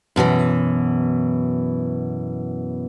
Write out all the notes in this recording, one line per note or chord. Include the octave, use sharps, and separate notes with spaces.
F#2 B2 D#3 E3